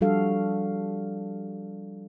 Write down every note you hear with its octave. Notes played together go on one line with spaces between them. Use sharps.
F3 G3 D4 F#4 A4 F5